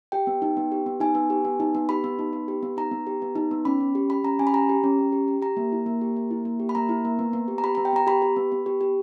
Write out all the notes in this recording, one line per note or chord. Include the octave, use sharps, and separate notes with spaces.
G4 G5
B3
D#4
B3
G4
B3
D#4 G#5
B3
G4
B3
D#4
B3
G4 B5
B3
D#4
B3
G4
B3
D#4 A#5
B3
G4
B3
D#4
B3
C#4 B5
C#4
G4
G4 B5
C#4 A#5
C#4 G#5
B5
G4 A#5
G4
C#4
C#4
G4
G4
G4 A#5
A#3
E4
A#3
G4
A#3
E4
A#3
G4
B5
A#3 A#5
E4
A#3
B3
B3
G4
A#5
G4 B5
B3 A#5
G5
B3 A#5
G4 B5
G4
B3
B3
G4
G4